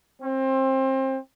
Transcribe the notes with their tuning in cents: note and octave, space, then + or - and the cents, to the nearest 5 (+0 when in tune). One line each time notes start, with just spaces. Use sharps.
C4 +25